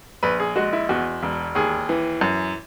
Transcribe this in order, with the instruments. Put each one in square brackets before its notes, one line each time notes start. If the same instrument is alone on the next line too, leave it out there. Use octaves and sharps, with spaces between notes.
[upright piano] A#1 B4
G#4
G#3 F#4
E4
E2 F#4
E1
D#2 G#4
E3
F#2